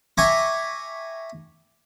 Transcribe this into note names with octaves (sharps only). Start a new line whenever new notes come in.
E5 G5 G#5 A#5 C#6 D6